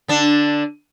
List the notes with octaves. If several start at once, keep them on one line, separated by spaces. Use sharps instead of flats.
D3 D4